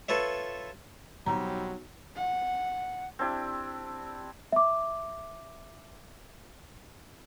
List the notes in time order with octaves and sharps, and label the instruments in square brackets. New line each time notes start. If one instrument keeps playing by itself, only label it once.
[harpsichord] F4 A4 B4 C#5 E5
[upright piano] B1 [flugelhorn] F#3 [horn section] G3 C4 D#4 [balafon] A#5
[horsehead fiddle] F#5
[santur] C4 D4 E4 G4
[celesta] E5 D6